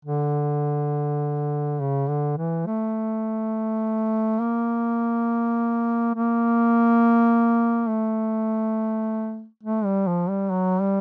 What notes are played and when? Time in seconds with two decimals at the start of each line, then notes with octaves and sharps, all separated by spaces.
0.05 D3
1.80 C#3
2.09 D3
2.38 E3
2.67 A3
4.41 A#3
6.15 A#3
7.89 A3
9.63 A3
9.85 G3
10.08 F3
10.29 G3
10.50 F#3
10.80 G3